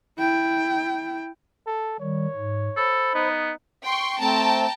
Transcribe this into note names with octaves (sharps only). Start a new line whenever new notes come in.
E4 G5
A4
D#3 G3 C#5
G#2
A4 C5 B5
B3 D#4
G5 C6 C#6
A3 C4 G5 A5 A#5